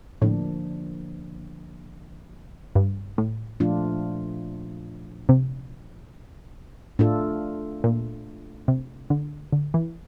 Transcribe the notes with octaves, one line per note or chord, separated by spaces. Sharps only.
A2 D3 F3 A#3 D4
G2
A2
A#2 F3 A3 D4 F4
C3
A2 A3 D4 F4 A4
A#2
C3
D3
D3
E3